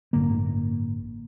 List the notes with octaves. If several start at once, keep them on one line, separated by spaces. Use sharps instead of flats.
A1 G2 D3 A#3